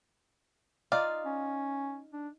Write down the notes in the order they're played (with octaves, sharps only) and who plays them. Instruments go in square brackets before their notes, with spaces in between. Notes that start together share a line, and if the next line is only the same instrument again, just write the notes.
[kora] D#4 F4 [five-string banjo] D5 F5
[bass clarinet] C#4
D4